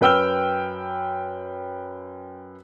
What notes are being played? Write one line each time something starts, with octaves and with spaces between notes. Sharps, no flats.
F#2 B4 G5 E6 F6 G7